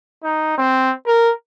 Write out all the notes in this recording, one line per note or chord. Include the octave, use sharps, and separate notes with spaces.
D#4
C4
A#4